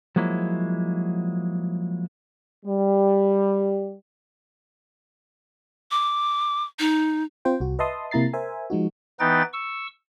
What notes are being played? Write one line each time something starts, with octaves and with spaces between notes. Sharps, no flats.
F3 F#3 G#3 A#3 E4
G3
D6
D#4
C4 F4 C5 G5
C2 F#4
B4 D#5 E5 A5 C6 D#6
C3 A#3 E4 A#5 A6 C7
A#4 C5 E5 G#5
F3 G#3 D#4 F#4
E3 B3 D#4 B4 G5 A6
C#6 E6